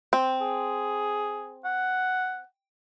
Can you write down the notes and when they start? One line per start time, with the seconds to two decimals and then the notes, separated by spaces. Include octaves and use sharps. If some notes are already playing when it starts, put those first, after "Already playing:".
0.13 C4
0.41 G#4
1.64 F#5